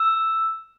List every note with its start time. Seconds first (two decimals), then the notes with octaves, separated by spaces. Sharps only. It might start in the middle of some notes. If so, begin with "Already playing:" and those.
Already playing: E6